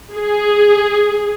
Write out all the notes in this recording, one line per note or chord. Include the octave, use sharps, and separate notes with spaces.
G#4